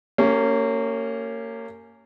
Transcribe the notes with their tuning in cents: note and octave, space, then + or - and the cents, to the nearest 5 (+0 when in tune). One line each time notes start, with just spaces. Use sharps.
A#3 -30 C#4 +0 G4 +0